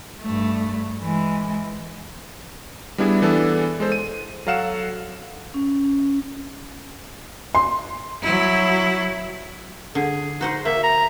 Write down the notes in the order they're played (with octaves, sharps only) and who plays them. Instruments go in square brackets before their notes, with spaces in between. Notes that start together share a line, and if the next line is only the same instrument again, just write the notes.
[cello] G2 A3
E3 G#3
[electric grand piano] G3 B3 D4 E4 G#4
E3 B3 D4 A4
G#3 A4 C5
D#7
F#3 A4 F5 F#5 E7
[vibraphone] C#4
[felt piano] C6
[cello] F#3 E4
[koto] D3 [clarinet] G#4
[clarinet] D#4 [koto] F#4 C5 F#5
[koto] A#3 [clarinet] E5
[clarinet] A#5